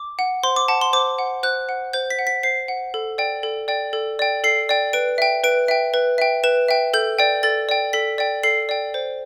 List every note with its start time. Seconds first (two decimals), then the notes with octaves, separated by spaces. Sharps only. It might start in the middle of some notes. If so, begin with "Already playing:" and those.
Already playing: D6
0.19 F#5
0.43 C5 C6
0.56 D6
0.68 F#5 A5
0.81 C6
0.93 C5 D6
1.18 F#5
1.43 C5 F#6
1.69 F#5
1.93 C5 G6
2.10 B6
2.19 F#5
2.27 B6
2.43 C5 C7
2.68 F#5
2.94 A4
3.18 D5 G5
3.43 A4
3.68 D5 G5
3.93 A4
4.19 D5 G5
4.44 A4 C7
4.69 D5 G5
4.93 B4 D7
5.18 E5 G5
5.44 B4 D7
5.68 E5 G5
5.94 B4
6.18 E5 G5
6.44 B4 E7
6.68 E5 G5
6.94 A4 G6
7.19 D5 G5
7.43 A4 A6
7.69 D5 G5
7.93 A4 B6
8.18 D5 G5
8.43 A4 C7
8.69 D5 G5
8.94 C5